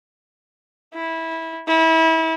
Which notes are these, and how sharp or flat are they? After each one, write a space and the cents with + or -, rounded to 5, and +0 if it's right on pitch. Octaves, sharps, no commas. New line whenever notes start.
E4 -15
E4 -30